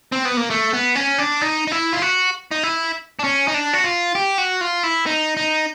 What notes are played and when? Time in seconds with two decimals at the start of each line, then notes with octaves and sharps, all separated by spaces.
0.12 C4
0.25 B3
0.37 A#3
0.50 A3
0.73 B3
0.95 C#4
1.19 D4
1.41 D#4
1.67 D#4
1.72 E4
1.93 F4
2.02 F#4
2.51 D#4
2.63 E4
3.19 D4
3.24 C#4
3.48 D#4
3.54 D4
3.73 F#4
3.84 F4
4.15 G4
4.38 F#4
4.61 F4
4.83 E4
5.06 D#4
5.37 D#4